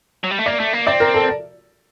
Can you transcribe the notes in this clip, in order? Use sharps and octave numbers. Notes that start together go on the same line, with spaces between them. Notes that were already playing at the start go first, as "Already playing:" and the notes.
F#3
G3
A3
A#3 D5
A3
A#3
C4 D5
A#4
A4